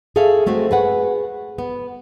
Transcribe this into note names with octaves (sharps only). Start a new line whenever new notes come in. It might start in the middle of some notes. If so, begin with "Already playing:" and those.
G#4 A4 C#5 E5 F5
G#3 A3 C4 F#4
G#4 B4 F#5
B3